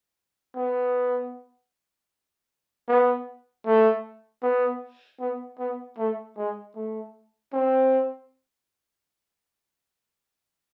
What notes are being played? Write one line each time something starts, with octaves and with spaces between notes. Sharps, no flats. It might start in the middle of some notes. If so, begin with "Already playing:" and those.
B3
B3
A3
B3
B3
B3
A3
G#3
A3
C4